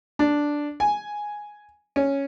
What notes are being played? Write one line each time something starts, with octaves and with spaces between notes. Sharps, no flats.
D4
G#5
C#4